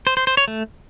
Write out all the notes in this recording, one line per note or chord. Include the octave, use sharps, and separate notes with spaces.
C5
C5
C5
C#5
A3